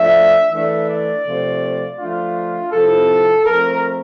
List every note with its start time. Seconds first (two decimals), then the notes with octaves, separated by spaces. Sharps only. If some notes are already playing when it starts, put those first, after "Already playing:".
Already playing: F3 A3 D4 E5
0.50 E3 A3 D4 E5
0.88 D5
1.24 C3 F3 A3
1.98 F3 A3 D4 F4
2.72 C3 F3 C4 E4 A4
3.46 F3 A3 C4 A#4